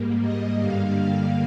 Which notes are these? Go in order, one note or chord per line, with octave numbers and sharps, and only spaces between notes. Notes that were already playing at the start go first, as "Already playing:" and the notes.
Already playing: G#2 G3 A#3
D#5
G2 D3 G3 A#3 F5
F5